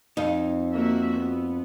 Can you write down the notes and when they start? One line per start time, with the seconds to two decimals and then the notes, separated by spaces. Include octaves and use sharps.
0.17 F2 D#4 F5
0.74 A#3 F#4 E5
1.17 B3